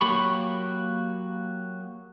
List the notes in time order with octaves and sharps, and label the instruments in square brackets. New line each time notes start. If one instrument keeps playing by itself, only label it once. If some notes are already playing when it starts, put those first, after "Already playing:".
[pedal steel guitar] F#3 A#3 G4 B5 C#6